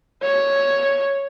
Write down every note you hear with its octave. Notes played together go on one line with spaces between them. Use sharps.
C#5